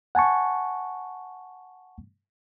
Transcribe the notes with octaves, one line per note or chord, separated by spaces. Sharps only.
F#5 G#5 A5 C#6